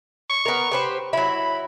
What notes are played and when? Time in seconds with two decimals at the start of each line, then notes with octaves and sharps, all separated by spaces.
0.29 C#6
0.46 B3 A#4
0.71 G4 B4 C5
1.13 F#3 E4 B5